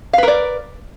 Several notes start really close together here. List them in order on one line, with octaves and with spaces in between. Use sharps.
F5 B4 A#4 D5